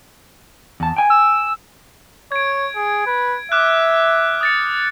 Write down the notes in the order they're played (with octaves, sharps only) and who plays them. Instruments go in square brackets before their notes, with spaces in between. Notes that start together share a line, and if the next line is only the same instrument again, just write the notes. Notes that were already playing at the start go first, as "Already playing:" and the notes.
[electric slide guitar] E2 A5
G5 G#5
[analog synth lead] E6
[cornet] C#5 [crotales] G#6 D7
[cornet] G#4
B4
[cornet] E5 [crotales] D6 F6 F#6
[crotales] D#6 A6 C#7